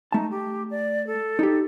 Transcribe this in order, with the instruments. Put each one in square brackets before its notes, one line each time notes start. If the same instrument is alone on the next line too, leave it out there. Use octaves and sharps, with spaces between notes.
[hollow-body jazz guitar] A3 A5 [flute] D#4
[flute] G4
D5
A4
[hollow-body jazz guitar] D#4 G4